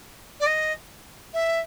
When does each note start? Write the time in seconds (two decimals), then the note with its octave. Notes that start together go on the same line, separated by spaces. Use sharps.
0.40 D5
0.46 D#5
1.33 E5